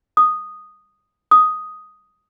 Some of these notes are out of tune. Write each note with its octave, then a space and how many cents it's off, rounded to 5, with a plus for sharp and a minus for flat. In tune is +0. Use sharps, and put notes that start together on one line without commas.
D#6 -5
D#6 +5